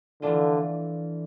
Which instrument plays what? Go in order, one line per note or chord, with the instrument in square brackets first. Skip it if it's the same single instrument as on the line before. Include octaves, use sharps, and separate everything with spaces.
[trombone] D3 [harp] E3 A3 D4 F4